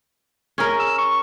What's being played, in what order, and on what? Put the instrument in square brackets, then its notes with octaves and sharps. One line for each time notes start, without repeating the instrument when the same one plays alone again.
[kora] C#4 G#4 A#4
[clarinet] E6
C#6